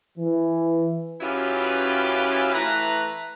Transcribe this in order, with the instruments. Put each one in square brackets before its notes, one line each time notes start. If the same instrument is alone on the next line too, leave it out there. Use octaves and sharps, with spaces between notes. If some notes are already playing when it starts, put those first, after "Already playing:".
[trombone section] E3
[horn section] F#2 C#4 E4 F4 G4 B4
E3 A3 B4 A#5